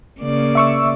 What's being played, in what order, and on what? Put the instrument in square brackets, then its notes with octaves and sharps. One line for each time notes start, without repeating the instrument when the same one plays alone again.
[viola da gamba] C#3 A#3 D5
[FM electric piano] E5 C#6 E6